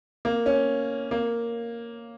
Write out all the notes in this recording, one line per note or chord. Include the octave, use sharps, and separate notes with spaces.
A#3
C#4
A#3